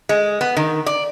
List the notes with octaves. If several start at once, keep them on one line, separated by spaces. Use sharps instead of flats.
G#3
B3
D#3
D5